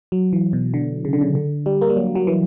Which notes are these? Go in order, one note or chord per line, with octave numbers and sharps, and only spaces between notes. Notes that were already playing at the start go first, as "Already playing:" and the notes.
F#3
E3
B2
D3
C#3
D3
C#3
D3
G3
A#3
G3
F#3
F#3
E3